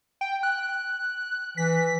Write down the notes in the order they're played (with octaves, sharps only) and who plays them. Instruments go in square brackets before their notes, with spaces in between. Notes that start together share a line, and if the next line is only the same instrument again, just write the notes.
[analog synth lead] G5
F#6
[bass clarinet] E3 [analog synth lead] B6